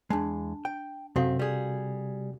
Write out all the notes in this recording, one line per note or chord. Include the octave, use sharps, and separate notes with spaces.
E2 G#3 D4 A5
G5
F#2 C3 C4 F#4 A4 F5
G3 G#4